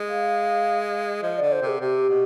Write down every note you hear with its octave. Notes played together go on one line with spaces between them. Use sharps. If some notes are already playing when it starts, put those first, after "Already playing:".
Already playing: G#3
F5
F3 D#5
D3 D5
C5
C3
G#4
C3 G4
B2